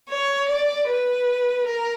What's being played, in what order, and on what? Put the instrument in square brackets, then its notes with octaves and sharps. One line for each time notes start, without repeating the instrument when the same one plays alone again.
[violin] C#5
D5
B4
A#4